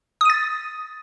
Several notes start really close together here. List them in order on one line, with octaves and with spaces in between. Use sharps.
D#6 D#7 A6